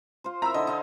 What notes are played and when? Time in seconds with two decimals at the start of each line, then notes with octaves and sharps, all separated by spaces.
0.24 F4 C5
0.42 E4 E5 A#5 E6
0.54 D3 D#4 D#5
0.67 D#4 C5 F5